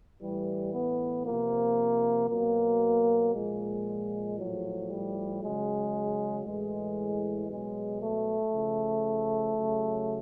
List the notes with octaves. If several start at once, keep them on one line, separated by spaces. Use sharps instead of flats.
A2 E3 G3
B3
C3 F3 A#3
B2 F#3 A#3
A#2 F3 G#3
A2 F3 F#3
G3
C#3 F#3 G#3
A2 E3 G#3
B2 F#3 G#3
A3
C#3 F3
C#3 F#3